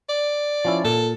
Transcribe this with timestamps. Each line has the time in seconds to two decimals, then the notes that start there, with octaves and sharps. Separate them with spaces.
0.09 D5
0.65 F3 C#4 E4
0.85 A#2 A4